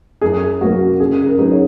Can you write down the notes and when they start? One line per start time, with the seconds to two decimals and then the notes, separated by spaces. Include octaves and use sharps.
0.21 F#2 G#4
0.61 F#3 A#3 C#4 F#4
0.99 C#3 G#4
1.26 A#4
1.38 F#3 D#4 G#4
1.52 C#5